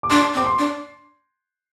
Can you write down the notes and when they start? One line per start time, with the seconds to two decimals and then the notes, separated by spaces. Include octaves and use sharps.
0.03 D6
0.10 D4 C6
0.34 C4
0.37 D6
0.46 C6
0.59 D4